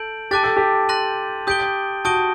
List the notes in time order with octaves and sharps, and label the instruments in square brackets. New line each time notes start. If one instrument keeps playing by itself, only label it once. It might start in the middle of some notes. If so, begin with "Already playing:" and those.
Already playing: [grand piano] A4 [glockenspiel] G6 D7 F#7
[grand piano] G4 [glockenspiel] A5 D6 F#6 A6
[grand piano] A4
G4
[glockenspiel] C6 F#6 A#6 D#7 F#7
[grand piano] G4 [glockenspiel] D#6 G6 D7 G7
[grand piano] F#4 [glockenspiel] A5 D#6 G6 D7 G7